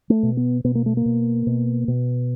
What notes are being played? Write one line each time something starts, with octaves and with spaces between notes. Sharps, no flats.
A3
B2
B3
B2 B3
A#3
A3
A#3
B2
B2
B2